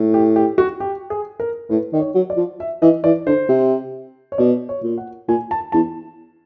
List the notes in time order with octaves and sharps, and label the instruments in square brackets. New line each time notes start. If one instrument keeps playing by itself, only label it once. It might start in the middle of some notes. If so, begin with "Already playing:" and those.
Already playing: [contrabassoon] A2
[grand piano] G4
G4
F#4
G4
G#4
A#4
[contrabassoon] A2 [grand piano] B4
[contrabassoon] D#3 [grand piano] D5
[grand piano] C#5
[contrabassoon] F#3
[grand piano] D5
[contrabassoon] F3
[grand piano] E5
[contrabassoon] E3 [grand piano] D#5
[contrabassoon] E3 [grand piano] D5
[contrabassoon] D3 [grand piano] C5
[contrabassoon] C3
[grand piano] C#5
[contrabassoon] B2 [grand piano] D5
[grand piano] C#5
[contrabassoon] A#2
[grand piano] F#5
[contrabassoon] A#2 [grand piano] G#5
[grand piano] A5
[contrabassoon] E2 [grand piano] A5